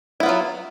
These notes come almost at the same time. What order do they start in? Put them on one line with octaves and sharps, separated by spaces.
E4 B3 F4 F#3